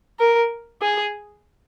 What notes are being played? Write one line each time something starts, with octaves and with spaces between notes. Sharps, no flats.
A#4
G#4